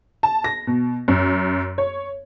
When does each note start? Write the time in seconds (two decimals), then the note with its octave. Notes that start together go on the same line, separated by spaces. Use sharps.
0.23 A5
0.44 A#6
0.67 B2
1.08 F#2
1.78 C#5